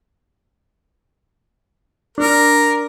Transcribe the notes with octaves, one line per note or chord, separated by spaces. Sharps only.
D4 A#4